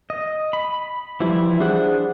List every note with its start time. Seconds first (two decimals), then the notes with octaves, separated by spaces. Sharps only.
0.10 D#5
0.53 B5
1.20 E3 F3 G3 E4
1.60 D4 G#4 C5 F#5 F#6